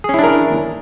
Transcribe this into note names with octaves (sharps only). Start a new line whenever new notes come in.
C#4 D4 E4 G#4 A#4